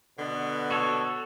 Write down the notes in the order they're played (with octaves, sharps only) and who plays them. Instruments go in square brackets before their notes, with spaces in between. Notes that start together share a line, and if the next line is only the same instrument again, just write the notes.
[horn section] B2 D3 B3
[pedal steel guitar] F#4 A4 C#5